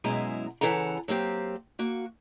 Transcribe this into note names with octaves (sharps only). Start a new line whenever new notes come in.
F#2 B2 G#3 E4 A#5
C#3 E3 A4 F#5 A#5
F#3 A#3 C4 G4
A#3 F#4